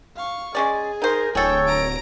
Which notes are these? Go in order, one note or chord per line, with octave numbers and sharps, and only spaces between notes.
F5 C#6
G#3 C#4 G#4 D5
D#4 A#4 C5
D1 G#4 A4 C#5 G5
A#5 D7